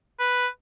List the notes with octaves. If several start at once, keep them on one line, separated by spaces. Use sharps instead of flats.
B4